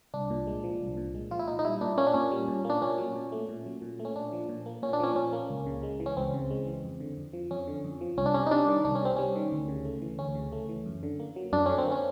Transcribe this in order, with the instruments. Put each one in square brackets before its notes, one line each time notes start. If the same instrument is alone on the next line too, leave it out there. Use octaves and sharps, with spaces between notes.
[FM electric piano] C2 D4
A#2
G#3
F3
C2
A#2
G#3
F3 F4
E4
A#2 D#4
D#4
G3 E4
A#2 D4
A#3 C#4
D4
A#2 C#4
G3
A#2
A#3
D4
A#2 C#4
F#3
A#2
A3
A#2
F#3
A#2
A3
C#4
A#2 D4
F3
A#2
A#3
A#2 C#4
D4
F3 C#4
A#2 C#4
A#3
C#2
C#3
G#3
E3
C#4
C#2 C4
C#3
G#3
E3
F2
D3
F2
F3
F2 C#4
D3
F2
F3
C2 C#4
D4
C3 C#4
D#4
G3 D4
D#3
C2 D4
C#4
C3 C4
G3 C#4
D#3
D2
C#3
A3
E3
D2 C#4
C#3
A3
E3
F#2
D3
A#3
F#3
F#2 D4
D3 C#4
C4
A#3
C#4